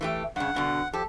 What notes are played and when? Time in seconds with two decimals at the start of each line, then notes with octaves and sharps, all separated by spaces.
0.01 E3 A3 G4
0.36 G2 C#3 F#5
0.55 G2 B2 D3
0.93 F3 G4 A4